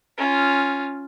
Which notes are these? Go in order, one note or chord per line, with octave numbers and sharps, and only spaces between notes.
C#4 F4